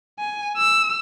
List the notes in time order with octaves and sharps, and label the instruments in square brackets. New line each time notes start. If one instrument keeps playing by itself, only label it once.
[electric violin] G#5
E6